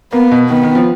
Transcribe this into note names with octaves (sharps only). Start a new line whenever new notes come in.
A#3 B3
B2
D#3 B3
D#3
F3